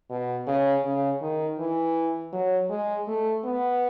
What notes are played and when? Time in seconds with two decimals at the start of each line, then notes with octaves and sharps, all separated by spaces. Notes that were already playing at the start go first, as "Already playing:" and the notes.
0.10 B2
0.47 C#3
0.84 C#3
1.22 D#3
1.59 E3
2.33 F#3
2.70 G#3
3.08 A3
3.45 B3